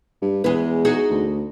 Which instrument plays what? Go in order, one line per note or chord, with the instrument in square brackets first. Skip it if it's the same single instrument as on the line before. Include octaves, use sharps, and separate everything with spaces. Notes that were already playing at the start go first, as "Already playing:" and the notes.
[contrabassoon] G2
[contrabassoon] E2 [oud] G#3 B4
[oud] D#4 F#4 G#4
[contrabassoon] D2